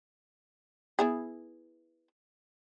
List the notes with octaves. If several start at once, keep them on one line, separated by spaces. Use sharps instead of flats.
B3 E4 G#4